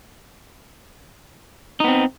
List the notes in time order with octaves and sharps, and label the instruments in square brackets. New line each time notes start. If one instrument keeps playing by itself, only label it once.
[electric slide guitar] D#4
B3
C4